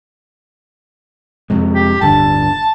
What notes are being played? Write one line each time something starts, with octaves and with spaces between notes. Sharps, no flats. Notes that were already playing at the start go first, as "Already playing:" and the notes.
F2 C3 G#3
G4
D1 G2 D3 A5